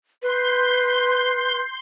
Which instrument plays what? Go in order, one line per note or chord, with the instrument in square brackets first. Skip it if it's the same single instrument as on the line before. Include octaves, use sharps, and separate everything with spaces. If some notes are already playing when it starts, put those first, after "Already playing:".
[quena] B4 [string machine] C6 G6